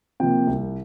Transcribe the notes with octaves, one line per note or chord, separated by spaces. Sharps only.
C3 F3 A#3 G5
C2